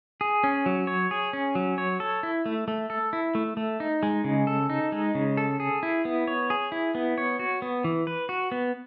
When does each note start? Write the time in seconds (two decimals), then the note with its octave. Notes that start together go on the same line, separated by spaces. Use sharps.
0.21 G#4
0.44 C#4
0.66 F#3
0.87 C#5
1.11 G#4
1.33 C#4
1.55 F#3
1.78 C#5
2.00 A4
2.23 E4
2.46 A3
2.68 A3
2.90 A4
3.13 E4
3.35 A3
3.57 A3
3.80 D#4
4.03 G#3
4.24 C#3
4.47 A4
4.70 D#4
4.92 G#3
5.15 C#3
5.37 A4
5.60 G#4
5.83 E4
6.05 B3
6.27 C#5
6.50 G#4
6.72 E4
6.95 B3
7.18 C#5
7.39 F#4
7.62 B3
7.84 E3
8.07 B4
8.29 F#4
8.52 B3